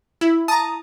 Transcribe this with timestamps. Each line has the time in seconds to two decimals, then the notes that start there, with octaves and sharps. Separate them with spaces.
0.21 E4
0.48 A5 A#5 D#6